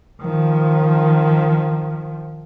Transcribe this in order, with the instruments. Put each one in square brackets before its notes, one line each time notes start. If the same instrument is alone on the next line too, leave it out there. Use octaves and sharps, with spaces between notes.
[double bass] D#3 F3